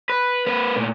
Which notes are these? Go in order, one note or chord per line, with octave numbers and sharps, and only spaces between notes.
B4
A#3 B4
A#2 A3